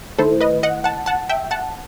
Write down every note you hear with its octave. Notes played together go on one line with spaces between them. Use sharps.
D#3 A3 E4 A4 C5
B4 D#5
D#5 F#5
F#5 A5
F#5 A5
E5 G5
F#5 A5